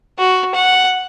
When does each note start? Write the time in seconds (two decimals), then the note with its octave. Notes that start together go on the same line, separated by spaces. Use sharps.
0.19 F#4
0.55 F#5